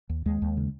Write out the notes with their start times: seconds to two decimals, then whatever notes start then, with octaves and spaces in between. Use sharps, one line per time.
0.09 D#2
0.26 D#2 G#3
0.42 D#2
0.57 C#3